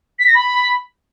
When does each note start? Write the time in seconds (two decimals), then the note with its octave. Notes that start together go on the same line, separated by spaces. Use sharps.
0.19 B6
0.27 A#6
0.34 B5